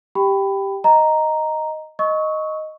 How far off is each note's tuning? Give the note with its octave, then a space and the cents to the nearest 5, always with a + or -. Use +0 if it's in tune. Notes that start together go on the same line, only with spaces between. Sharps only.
G4 +0 G5 +0 B5 +15
D#5 +0 A#5 +0
D#5 +0 C#6 +0 E6 -40